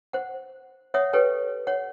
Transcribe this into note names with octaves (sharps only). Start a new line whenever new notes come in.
C5 F#5
C#5 E5 F#5 D#6
G4 A4 B4 C#5 G5
C#5 F#5